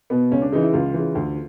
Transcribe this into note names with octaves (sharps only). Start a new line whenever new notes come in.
B2 B3
C#2 C#4
D4
C#3 E3 D#4
E4
C#2 F4
C#3 E3
D2